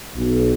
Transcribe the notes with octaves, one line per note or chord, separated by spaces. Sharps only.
B1